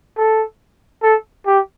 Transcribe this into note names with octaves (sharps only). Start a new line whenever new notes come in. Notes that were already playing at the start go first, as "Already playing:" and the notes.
A4
A4
G4